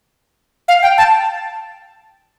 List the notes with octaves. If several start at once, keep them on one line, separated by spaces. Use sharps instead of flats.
F5
G5
A5